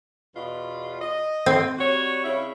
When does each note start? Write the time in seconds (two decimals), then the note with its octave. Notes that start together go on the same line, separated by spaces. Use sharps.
0.35 E2 B2 F4
1.01 D#5
1.46 C4
1.78 G3 F#4 C#5
2.24 C#3 E4